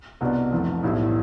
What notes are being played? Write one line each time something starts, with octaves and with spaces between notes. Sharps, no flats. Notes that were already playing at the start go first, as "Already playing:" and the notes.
C2 B2 B3 D4
F2 E3 A3
B1 A2 G3 B3 E4